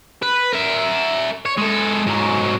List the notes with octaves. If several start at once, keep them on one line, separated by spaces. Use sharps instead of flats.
B4
A#4 E5
C#5
G#3 A4
G#2 F#3